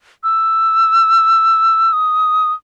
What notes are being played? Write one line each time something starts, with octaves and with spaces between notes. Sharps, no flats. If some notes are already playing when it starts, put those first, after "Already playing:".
E6
D#6